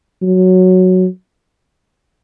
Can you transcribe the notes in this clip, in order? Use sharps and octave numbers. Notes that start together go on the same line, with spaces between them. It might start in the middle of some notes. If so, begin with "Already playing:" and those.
F#3